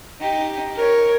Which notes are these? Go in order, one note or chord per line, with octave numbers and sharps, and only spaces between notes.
D#4 G4
A#4 C#5